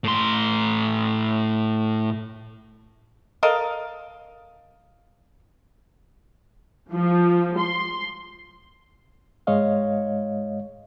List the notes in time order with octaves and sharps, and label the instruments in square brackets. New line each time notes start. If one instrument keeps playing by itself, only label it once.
[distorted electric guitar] A2 C6
[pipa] A4 A#4 D#5 F5
[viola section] F3
C6
[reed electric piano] G#2 G#3 C#5 D#5 F5